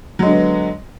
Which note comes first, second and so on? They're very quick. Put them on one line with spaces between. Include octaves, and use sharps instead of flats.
F#3 G#3 D3 B3